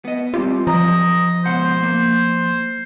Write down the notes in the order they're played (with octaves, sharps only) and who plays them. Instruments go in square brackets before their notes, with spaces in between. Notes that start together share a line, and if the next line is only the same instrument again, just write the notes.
[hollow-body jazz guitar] B3 D#5
[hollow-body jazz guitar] G3 C4 G4 [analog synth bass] F4
[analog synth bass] F3 [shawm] D#5 [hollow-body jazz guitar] A#5
[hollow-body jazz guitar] C#2 B2 F#5 [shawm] C5
[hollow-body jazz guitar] A#3